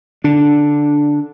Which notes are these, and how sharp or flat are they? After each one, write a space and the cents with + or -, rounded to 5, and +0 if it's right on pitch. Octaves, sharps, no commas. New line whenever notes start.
D3 -10 D4 +0